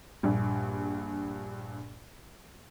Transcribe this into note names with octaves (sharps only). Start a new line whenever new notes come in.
A#1 G2